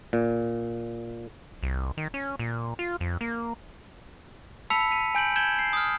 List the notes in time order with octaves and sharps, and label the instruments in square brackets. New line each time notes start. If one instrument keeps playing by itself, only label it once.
[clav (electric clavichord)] A#2
[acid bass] C2
D#3
C#4
A#2
F4
F2
A#3
[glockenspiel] A5 B5 E6 B6 C#7 F7
B6 D#7
G#5 G6 D7 F#7
G6 G#6 E7 F#7 G7
C7
D#6 F6